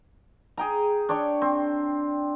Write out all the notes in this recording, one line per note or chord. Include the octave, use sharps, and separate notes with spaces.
G#4 G5 A#5
D4 C#5 G5 C#6
C4